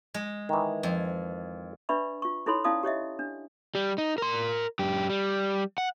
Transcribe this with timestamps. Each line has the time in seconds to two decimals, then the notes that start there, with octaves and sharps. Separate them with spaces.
0.14 G#3
0.49 D#3 E3
0.83 F2
1.89 D4 B4 D5 E5 B5 C#6
2.22 F4 C#6
2.46 D#4 E4 A4 C#5 B5 C6
2.64 C#4 E4 D5 F5 A5 D#6
2.83 G4 C#5 D#5 E5
3.19 D4
3.75 G3
3.98 D#4
4.18 A#4 C6
4.79 F#2 G4
5.09 G3
5.78 F#5